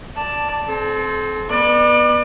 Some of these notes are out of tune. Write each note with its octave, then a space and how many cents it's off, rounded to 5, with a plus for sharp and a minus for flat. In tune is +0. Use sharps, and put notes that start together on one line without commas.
D5 +0 A5 +5
C4 +0 A4 -40
B3 -25 D5 +35